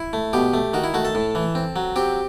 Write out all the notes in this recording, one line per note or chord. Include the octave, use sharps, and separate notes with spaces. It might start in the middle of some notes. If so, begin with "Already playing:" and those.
Already playing: E4
A3
B2 G4
A3
D#3 F#4
E4
A3 F#4
A4
A2
E3
C4
F#3
C4 G4